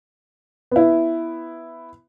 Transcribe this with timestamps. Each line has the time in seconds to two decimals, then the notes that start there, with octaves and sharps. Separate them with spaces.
0.71 B3 E4